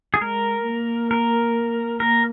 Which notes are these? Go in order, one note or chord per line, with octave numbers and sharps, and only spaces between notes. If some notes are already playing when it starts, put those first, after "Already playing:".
G#4
G#3 A#4
A#3
A#4
A#3 A#4